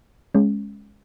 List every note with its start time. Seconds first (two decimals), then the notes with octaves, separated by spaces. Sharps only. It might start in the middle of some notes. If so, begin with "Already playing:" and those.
0.35 G#3 C#4